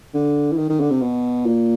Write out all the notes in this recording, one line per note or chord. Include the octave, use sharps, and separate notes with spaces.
D3
E3
D#3
D#3
D3
C3
B2
A#2